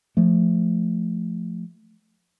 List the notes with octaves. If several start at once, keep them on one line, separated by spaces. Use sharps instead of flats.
F3 A3